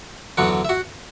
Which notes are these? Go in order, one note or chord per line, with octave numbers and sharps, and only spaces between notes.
E2 D3 F#3 F#4 F#5
E5
F#4 F#5